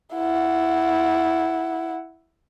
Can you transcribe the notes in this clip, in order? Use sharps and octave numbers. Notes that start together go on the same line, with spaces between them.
E4 F#5